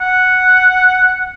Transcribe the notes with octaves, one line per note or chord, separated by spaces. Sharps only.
F#5